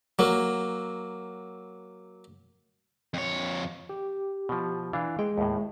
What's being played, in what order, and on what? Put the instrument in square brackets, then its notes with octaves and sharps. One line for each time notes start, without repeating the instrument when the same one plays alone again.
[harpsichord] F#3 A#3
[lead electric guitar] F2 C#5
[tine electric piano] G4
[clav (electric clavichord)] B2 F3
[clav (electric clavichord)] E3 D4 [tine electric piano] F5
[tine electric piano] G#3 [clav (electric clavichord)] G5
[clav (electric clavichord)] D#2 A2